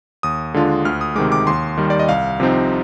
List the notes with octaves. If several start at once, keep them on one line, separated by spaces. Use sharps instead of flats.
D#2 D#6
D3 G#3 D4 F4
D2 F6
D#6
C3 D#3 G#3 D6
D6
D#2 C6
D#3 G3
D5
D#5
C2 F5
C3 F3 C4 D#4